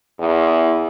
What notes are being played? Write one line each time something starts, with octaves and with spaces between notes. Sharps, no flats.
E2